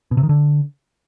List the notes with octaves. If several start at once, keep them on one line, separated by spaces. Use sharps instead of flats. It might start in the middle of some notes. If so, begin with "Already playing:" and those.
B2
C3
D#3
D3